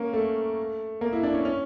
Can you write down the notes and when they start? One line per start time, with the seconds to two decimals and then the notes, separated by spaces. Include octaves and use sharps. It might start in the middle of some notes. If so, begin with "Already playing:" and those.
Already playing: A#3 C#4
0.13 A3
1.01 A#3
1.13 E4
1.23 D4
1.34 C#4
1.45 C#4